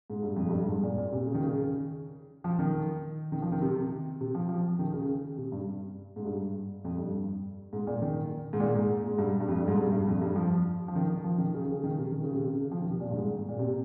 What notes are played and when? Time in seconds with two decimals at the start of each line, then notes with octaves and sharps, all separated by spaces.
0.10 G#2
0.22 G2
0.36 F2
0.49 G2
0.63 G2
0.68 G#2
0.83 A#2
0.98 A#2
1.12 C3
1.26 C#3
1.34 D#3
1.41 C#3
2.44 F3
2.59 D#3
3.32 D#3
3.42 F3
3.52 D#3
3.62 C3
4.21 C3
4.35 F3
4.49 F3
4.79 D#3
4.93 C#3
5.38 C3
5.52 G2
6.16 G#2
6.25 G2
6.85 F2
6.98 G2
7.73 G#2
7.87 A#2
8.02 D#3
8.53 G#2
8.60 A#2
8.75 G#2
9.07 G#2
9.18 G2
9.40 G2
9.48 F2
9.58 G2
9.68 G#2
9.77 G2
9.92 G2
10.07 F2
10.21 G2
10.36 F3
10.88 F3
10.95 D#3
11.24 F3
11.38 D#3
11.54 C#3
11.72 C#3
11.84 D#3
11.98 C3
12.12 D#3
12.23 C#3
12.35 C3
12.45 C#3
12.71 F3
12.81 D#3
12.91 C3
13.00 A#2
13.10 G2
13.15 G#2
13.49 A#2
13.59 C3